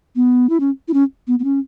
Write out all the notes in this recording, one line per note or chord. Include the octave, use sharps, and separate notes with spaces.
B3
E4
C#4
E4
C#4
B3
B3
C#4